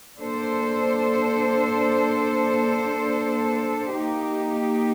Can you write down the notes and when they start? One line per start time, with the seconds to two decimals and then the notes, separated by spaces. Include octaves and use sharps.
0.18 A#3 D4 A4 C5
3.92 A#3 D#4 G4